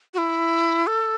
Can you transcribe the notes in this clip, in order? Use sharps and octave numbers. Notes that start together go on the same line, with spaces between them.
F#4
E4
A4